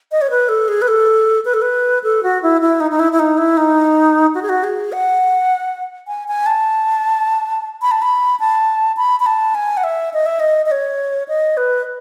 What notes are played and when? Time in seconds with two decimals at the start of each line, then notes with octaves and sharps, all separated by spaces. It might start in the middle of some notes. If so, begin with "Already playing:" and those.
0.12 D#5
0.21 C#5
0.30 B4
0.49 A4
0.68 G#4
0.82 B4
0.88 A4
1.45 B4
1.54 A4
1.62 B4
2.04 A4
2.23 F#4
2.43 E4
2.61 E4
2.80 D#4
2.91 D#4
2.99 E4
3.12 E4
3.19 D#4
3.38 E4
3.57 D#4
4.35 F#4
4.42 G#4
4.49 F#4
4.64 G#4
4.92 F#5
6.08 G#5
6.28 G#5
6.46 A5
7.82 B5
7.91 A5
8.02 B5
8.40 A5
8.97 B5
9.20 B5
9.26 A5
9.55 G#5
9.77 F#5
9.84 E5
10.14 D#5
10.26 E5
10.40 D#5
10.66 D#5
10.71 C#5
11.28 D#5
11.57 B4